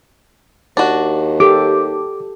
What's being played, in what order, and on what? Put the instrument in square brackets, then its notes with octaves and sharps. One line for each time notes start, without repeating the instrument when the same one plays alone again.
[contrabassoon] D#2 [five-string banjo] D4 F#4
[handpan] G4 A4 [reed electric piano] D6